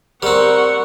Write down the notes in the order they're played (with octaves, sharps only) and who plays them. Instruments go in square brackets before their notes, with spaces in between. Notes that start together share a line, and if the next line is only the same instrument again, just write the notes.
[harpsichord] G3 C4 [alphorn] A#4 [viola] F#5 C#6